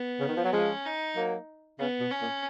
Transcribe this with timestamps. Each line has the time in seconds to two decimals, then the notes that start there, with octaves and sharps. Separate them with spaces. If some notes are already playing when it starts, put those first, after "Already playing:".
Already playing: B3
0.20 C#3
0.28 D#3
0.37 F3
0.45 F#3
0.53 F3 G#3 C#4
0.85 D#4
1.16 F#3 A#3
1.79 C#3 B3
2.00 B2
2.11 C#4
2.21 A#2